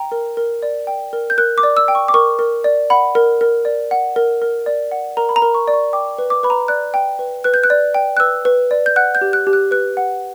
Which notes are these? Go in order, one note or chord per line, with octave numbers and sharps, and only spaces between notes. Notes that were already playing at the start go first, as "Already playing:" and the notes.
Already playing: G5 A#5
A#4
A#4
D5
G5
A#4
G6
A#4 F#6
D6
D5
E6
G5
C#6
D6
A#4 C#6
A#4
D5
F#5 B5
A#4
A#4
D5
F#5
A#4
A#4
D5
F#5
A#4 A#5
B5
A#5
A#4
C#6
D5
C#6
G5 D6
B4
D6
B4 B5
A#5
D5 F#6
G5
B4
B4 F#6
G6
F#6
D5
G5
F#6
B4 E6
B4
D5
G6
F#5 F#6
G6
G4
F#6
G4
F#6
B4 F#6
F#5